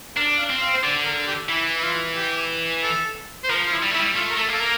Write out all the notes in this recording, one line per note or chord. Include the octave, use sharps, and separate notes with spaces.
D4 A#4
F5
C4
F5
C5
D3 D5
A#4
G4
E3 E4
E4
F4
G4
A4
C5
F3 A#4
F4
E4
G3
A3 E4
G3
A3 F4
A#4
A3 A4
A#3 A4
A#4